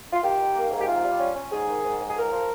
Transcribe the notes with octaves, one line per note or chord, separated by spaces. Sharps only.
F4
D#3 G4
D#3
A#3
G#2
G4
C3 F4
G3
C#4
C#4
G#2 G#4
D#3
G#2
G#2
G#4
C#2 A#4
F3